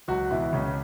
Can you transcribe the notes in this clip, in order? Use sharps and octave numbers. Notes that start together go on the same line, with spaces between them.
C#2 F#3 F#4
B2 E3 E4
C#2 C#3 C#4